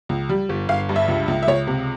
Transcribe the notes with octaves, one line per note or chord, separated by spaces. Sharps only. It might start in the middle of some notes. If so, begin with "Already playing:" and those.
C#2
G3
G1
G1 F5
G2
E5
C#2
C#2
E5
C#2 C#5
C3